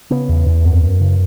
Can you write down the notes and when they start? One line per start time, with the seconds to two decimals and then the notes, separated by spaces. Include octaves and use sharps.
0.11 C#3 B3
0.29 E2
0.46 E2
0.65 F#2
0.83 F#2
1.01 C#3